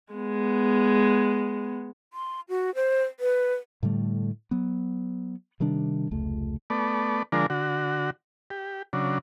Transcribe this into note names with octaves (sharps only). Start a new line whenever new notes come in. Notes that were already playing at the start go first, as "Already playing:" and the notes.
G#3 B3
C6
F#4
C5
B4
A2 D3 G3 A3
F#3 B3
C3 D#3 G3 D4
F1 C#2 A3
A3 B3 D5
D3 F3 G#3 D4 A#4
D3 F#4
G4
C#3 F#3 D4